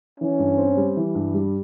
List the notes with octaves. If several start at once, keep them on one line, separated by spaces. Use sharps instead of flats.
E3 C#4
G2
C4
G3
E3
G2
G3